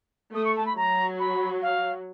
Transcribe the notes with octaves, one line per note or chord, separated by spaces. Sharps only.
A3 D#6
C#6
A5
B5
F#3 A#5
B5
F5